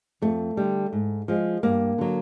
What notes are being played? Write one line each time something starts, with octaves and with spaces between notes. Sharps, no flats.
F2 A3
D3 G3
G#2
F3 G#3
G2 A#3
D3 F#3